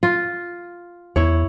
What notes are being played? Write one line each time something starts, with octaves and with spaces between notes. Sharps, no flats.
F4
E2 E4 C#5